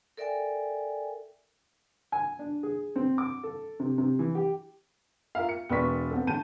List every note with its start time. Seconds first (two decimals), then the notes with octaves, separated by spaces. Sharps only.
0.17 A4 A#4 D5 E5 G5 G#5
2.12 G#5
2.39 D4
2.63 G#4
2.96 C4
3.18 D6
3.43 A4
3.80 C3
3.98 C3
4.19 E3
4.35 G4
5.35 F4 A#4 E5 F5
5.49 C#7
5.69 E1 A#4 B4 D5 C#6 B6
6.11 B3 C4 A4
6.27 A2 D3 A5 G6 D#7